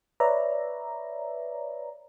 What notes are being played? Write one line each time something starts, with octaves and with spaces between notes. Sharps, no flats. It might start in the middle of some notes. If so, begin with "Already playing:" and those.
B4 C#5 D5 E5 A#5